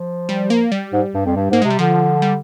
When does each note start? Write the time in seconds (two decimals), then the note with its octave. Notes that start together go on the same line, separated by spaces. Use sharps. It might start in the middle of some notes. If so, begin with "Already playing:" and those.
Already playing: F3
0.29 G3
0.50 A#3
0.72 G3
0.93 G#2
1.15 G2
1.26 F2
1.36 G2
1.50 G#2 A#3
1.62 C3 G#3
1.70 G3
1.79 D3 F3
2.22 G3